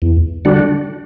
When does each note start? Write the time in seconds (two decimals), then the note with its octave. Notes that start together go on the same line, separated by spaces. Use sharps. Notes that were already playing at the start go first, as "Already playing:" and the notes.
0.02 E2
0.45 D3 G3 D4 F#4